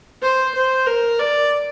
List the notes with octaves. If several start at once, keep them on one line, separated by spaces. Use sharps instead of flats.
C5
C5
A#4
D5